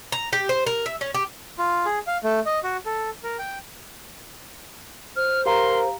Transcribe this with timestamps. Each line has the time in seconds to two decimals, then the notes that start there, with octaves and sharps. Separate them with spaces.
0.12 A#5
0.33 G4
0.49 C5
0.67 A#4
0.86 E5
1.01 C#4
1.14 G4
1.58 F4
1.86 G#4
2.07 F5
2.24 A3
2.46 D#5
2.64 F#4
2.86 A4
3.24 A#4
3.39 G5
5.16 C5 F6
5.46 G4 A#4 F5 A#5 C6